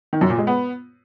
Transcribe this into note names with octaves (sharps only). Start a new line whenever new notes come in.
D#3
F#2
A#2
G#3
B3